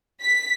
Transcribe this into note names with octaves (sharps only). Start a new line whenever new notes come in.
B6